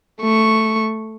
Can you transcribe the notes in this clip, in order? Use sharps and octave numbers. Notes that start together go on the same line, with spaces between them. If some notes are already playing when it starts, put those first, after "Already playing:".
A3 C#6